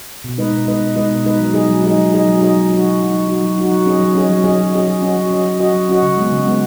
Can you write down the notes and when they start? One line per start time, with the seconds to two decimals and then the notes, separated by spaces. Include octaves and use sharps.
0.24 B2
0.38 G#3 D#4 B4 D#5
0.53 B2
0.67 G#3 D#4 B4 D#5
0.81 B2
0.96 G#3 D#4 B4 D#5
1.11 B2
1.25 G#3 D#4 B4 D#5
1.40 F#3
1.54 D#4 G#4 D#5
1.69 F#3
1.82 D#4 G#4 D#5
1.98 F#3
2.12 D#4 G#4 D#5
2.27 F#3
2.41 D#4 G#4 D#5
2.56 F#3
2.69 D#4 F#4
2.85 F#3
3.00 D#4 F#4
3.13 F#3
3.28 D#4 F#4
3.43 F#3
3.57 D#4 F#4
3.72 F#3
3.86 C#4 G#4 D#5
4.00 F#3
4.15 C#4 G#4 D#5
4.30 F#3
4.44 C#4 G#4 D#5
4.59 F#3
4.73 C#4 G#4 D#5
4.88 F#3
5.02 C#4 F#4 D#5
5.17 F#3
5.31 C#4 F#4 D#5
5.45 F#3
5.60 C#4 F#4 D#5
5.74 F#3
5.89 C#4 F#4 D#5
6.03 C#3
6.17 G#3 B3
6.32 C#3
6.47 G#3 B3